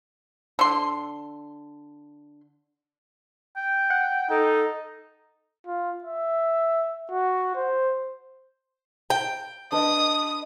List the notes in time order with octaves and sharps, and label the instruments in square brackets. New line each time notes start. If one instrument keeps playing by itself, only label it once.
[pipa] D3 C6
[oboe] G5
[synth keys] F#5
[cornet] D#4 [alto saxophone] A4
[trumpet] F4
E5
F#4
C5
[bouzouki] G5
[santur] D4 B4 D#5 [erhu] D#6